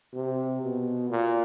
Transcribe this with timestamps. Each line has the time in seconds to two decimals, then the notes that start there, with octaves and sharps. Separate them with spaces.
0.13 C3
0.61 B2
1.10 A#2